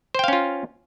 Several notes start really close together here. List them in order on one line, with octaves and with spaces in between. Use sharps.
C5 G5 F5 C#4 F4